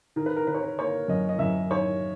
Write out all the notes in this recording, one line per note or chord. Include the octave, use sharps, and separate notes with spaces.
D#3 A#4
B4
A#4
D#3 B4
C#5
B4
A#3 C#5
F#2 D#5
D#5
F#2 E5
D#3 C#5